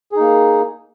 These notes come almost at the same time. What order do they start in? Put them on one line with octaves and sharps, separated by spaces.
G#4 D#4 A#3